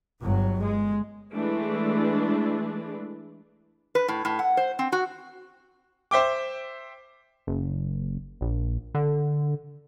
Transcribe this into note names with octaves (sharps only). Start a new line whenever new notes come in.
G1 F#3
G#3
E3 G#3 A3 D4 E4
B4
A2
A2
F#5
C5
C4
F#4
C5 E5 G5 D6
F#1
A#1
D3